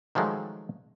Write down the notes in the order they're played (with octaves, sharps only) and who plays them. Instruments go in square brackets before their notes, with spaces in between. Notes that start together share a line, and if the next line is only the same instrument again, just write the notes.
[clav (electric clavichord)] D#3 F3 F#3 G#3 A3